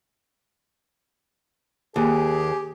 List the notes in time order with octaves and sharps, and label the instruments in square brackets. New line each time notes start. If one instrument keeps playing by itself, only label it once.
[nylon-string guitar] D#2 [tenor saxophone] G4 [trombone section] G#4